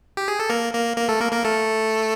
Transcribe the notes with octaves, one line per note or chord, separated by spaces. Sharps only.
G4
G#4
A4
A#3 A#4
A#3 A#4
A#3 A#4
A3 A4
A#3 A#4
A#3 A#4
A3 A4